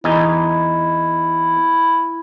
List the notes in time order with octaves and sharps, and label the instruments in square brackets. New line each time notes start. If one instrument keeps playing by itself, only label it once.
[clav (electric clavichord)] E2 D#4 G#5 [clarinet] E4